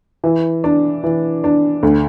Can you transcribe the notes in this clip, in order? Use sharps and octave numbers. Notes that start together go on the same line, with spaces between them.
E3
D4
E3
D4
D2